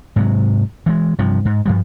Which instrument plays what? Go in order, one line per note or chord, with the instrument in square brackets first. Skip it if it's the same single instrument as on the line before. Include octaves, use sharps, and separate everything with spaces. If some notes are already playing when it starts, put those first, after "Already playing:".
[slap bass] G#2 C3 F#3
E3 G#3
G2 C3 F3
G#2
G2 F3 G3